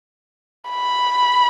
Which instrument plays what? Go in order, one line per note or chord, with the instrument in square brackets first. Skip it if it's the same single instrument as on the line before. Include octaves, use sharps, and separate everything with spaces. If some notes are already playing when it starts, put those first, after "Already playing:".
[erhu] B5